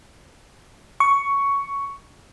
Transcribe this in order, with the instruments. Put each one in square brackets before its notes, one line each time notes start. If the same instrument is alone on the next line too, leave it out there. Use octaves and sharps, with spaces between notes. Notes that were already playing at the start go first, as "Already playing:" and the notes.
[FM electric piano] C#6